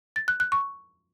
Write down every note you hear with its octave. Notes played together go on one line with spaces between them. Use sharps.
A6
F#6
F#6
C#6